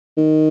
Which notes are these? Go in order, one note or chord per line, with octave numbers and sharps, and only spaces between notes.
D#3